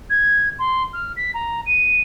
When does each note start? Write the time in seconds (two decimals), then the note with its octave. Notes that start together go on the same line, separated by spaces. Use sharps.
0.09 G#6
0.58 C6
0.93 F6
1.16 B6
1.34 A#5
1.66 D#7